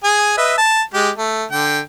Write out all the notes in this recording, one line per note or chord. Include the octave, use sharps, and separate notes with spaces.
G#4 G#5
B4 D#5 E5
A5
G#3 G4
A3
D3 G5